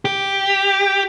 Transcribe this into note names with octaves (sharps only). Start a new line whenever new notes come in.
G4